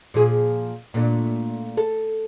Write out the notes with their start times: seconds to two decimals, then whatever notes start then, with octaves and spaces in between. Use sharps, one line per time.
0.14 A#2 F3 G#4
0.94 A#2 A3 D4
1.77 A4